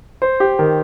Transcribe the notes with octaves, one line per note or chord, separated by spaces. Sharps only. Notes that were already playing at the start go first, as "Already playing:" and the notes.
C5
G4
D#3